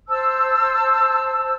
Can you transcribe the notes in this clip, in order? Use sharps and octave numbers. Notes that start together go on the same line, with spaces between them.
C5 A5 E6